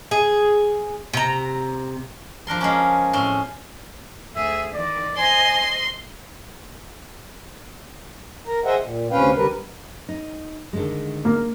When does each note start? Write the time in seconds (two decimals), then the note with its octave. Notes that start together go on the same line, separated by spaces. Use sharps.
0.11 G#4
1.13 C3 A#5
2.47 F3 D4 A#4 C6
2.61 G#3 A#3 C#4
3.13 A2 C4 C#4 C6
4.36 D2 G#4 E5
4.74 D#3 E3 D5
5.17 C5 D#5 G#5 C6
8.47 A#4 A#5
8.65 G#4 C5 D#5 E5 F#5 G5
8.81 A#2
9.11 D2 C3 C#4 B4 F5 G5
9.36 D3 G3 A#4 B4
10.09 D#4
10.73 D3 D#3 G#3
11.25 A#3